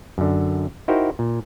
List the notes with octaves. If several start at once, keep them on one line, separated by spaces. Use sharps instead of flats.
F#2 D3
D#4 E4 F#4 A#4 C5 G5
A#2